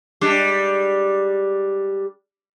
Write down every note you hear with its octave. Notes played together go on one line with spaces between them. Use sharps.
G3 G#3 D4